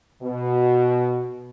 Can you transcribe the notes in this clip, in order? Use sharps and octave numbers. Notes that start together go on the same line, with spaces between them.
B2